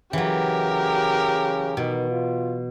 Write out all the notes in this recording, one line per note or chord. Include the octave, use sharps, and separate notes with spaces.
C#3 E3 F#3 G4 A#4
B2 D#3
F4